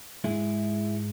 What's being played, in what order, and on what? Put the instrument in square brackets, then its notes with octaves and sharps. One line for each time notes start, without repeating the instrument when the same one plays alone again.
[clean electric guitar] G#2 G#3 E4 G#4